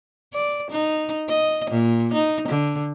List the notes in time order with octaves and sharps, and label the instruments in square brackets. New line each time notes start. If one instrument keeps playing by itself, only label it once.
[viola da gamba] D5
D#4
D#5
A#2
D#4
D3